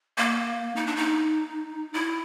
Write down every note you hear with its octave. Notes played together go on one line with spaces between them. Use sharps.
A#3
D#4
D4
D#4
E4